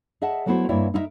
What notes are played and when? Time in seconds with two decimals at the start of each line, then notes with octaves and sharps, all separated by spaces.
0.22 G#4 D#5 E5 F#5 A5
0.46 F#3 A3 B3 E4 F#4 C5
0.69 G2 A#3 C4 E4 C#5 E5
0.94 D#4 E4 A#4 E5